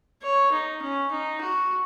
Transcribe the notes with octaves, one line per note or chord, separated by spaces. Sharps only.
C#5
D#4
C#4
D#4
F#4